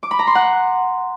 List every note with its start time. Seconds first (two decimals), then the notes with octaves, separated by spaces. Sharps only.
0.03 D6
0.11 B5
0.19 A#5
0.27 C6
0.35 F#5